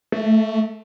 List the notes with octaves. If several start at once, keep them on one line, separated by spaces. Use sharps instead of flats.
A3